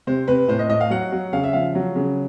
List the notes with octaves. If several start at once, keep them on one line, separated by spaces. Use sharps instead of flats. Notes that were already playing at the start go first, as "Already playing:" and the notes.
C3 C5
C3 B4
A2 C5
D#5
A2 D#5
F5
F#3 F#5
F#3
C#3 F5
E5
F3 F5
F#3
C#3